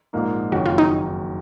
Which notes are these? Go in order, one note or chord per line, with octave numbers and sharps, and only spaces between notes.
A#1 G#2 F3 A#3 D#4
F#1 F2 D#3 F#3 C#4 F#4
F4
D#4